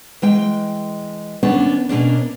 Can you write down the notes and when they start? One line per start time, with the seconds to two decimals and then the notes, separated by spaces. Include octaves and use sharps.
0.22 E3 G#3 G5
1.43 D#2 B3 C#4 D4
1.89 B2 A#3 C#4 D4